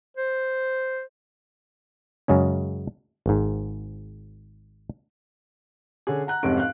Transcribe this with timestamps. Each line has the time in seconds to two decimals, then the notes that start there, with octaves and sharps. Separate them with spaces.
0.17 C5
2.28 F#2 C#3 G#3 C#4
3.26 G#1 G#2
6.07 D3 C#4 G#4
6.27 F#5 A#5 F#6
6.43 F1 C2 G#2 C3 C#4 D7
6.57 F5 F#6